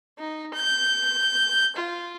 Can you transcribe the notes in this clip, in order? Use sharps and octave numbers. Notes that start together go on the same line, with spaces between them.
D#4
G6
F4